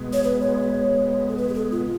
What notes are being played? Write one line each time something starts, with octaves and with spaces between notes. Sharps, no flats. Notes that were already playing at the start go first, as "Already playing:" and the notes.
Already playing: B2 G#3 B3
C#5
B4
C#5
A4
B4
G#4
A4
F4